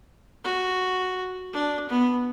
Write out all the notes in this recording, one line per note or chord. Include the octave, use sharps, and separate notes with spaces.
F#4
D4
B3